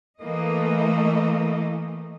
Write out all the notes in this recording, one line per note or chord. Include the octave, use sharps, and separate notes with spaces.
E3 A3 A#3 D#5